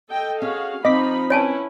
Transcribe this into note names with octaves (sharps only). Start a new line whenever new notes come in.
A4 D#5 G5
C#4 F#4 G#4 F5
F3 C4 D#4 D#5 B5 D6 B6
C#4 E4 B4 C#5 G#5 A5